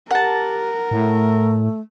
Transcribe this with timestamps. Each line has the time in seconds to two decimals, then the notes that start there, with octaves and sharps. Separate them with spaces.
0.11 G4 A#4 F#5 A5
0.91 A2 A3